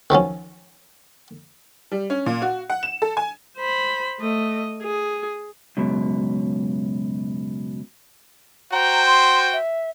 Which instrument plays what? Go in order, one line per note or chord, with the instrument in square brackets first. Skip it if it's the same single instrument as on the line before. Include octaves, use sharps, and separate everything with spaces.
[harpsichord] D#3 F3 F#3 C#4
[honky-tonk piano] G3
C#4
A#2
F#4
F#5
E7
A4
G#5
[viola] C5 B5
A3 D#5
G#4
[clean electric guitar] C#2 F#2 B2
[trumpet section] F#4 C5 G5 [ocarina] A#5
[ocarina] C6
E5